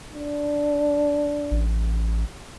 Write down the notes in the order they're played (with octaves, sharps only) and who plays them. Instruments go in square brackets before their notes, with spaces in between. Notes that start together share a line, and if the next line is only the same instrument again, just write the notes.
[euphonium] D4
[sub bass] A1